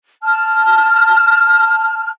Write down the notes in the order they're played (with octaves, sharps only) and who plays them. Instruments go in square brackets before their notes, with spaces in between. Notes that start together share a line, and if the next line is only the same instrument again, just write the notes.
[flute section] A5 F6